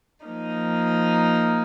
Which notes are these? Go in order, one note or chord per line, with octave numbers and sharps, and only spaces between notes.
F3 A#3 D#4